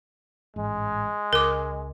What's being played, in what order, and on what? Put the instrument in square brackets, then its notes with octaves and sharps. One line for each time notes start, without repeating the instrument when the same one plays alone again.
[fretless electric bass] A1 G#2 [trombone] G#3
[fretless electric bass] C#2 [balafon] A#4 D6